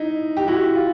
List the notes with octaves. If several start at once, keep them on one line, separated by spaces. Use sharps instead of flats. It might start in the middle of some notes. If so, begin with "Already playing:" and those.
Already playing: D#4 E4
G4
E4 F#4
F4 G4